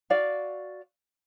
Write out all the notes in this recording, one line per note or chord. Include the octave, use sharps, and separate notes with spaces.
F#4 D5 F5